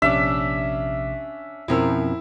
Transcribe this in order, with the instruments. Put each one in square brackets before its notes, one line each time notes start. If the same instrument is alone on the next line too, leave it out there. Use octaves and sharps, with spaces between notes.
[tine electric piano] A#1 C3 D6 [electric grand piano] C#4 D4 [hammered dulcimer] E5
[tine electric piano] F2 C4 C#4 [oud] B2 F3 A#4 [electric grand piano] E4 E6